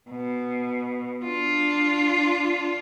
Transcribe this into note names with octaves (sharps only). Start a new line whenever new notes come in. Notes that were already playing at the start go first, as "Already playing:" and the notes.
B2
D4 F4